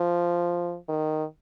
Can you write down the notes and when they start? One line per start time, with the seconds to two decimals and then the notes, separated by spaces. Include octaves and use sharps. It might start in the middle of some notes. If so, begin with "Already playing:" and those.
Already playing: F3
0.88 D#3